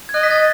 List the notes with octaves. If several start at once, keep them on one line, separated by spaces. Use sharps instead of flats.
G#6
D#5 F#6
B6
A6